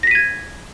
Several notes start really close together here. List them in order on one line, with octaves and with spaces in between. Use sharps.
A#6 B6 D#7 G#6